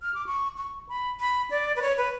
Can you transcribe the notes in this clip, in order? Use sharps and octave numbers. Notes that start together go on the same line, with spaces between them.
F6
D6
C#6
C#6
B5
B5
D5
B4
C#5
B4